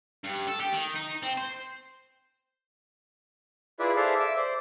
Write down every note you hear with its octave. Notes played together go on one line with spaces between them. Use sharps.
G2
A4
G4
D#3
D#4
C4
C5
E4 F4 G#4 B4 D5 E5
G#4 A4 C5 D5 E5 F5
E5 D6 E6
C5 D5